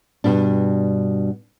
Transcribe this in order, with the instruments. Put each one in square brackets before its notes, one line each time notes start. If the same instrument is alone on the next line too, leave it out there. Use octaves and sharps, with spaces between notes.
[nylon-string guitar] G2 B2 G3 D4